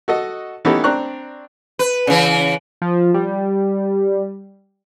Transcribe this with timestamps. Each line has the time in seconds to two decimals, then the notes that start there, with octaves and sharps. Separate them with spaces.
0.08 F#4 A4 D#5
0.65 E3 B3 C#4 D#4 G4 A4
0.84 C4 D4 A#5 C#6 F#6
1.79 B4
2.07 C#3 E3
2.82 F3
3.14 G3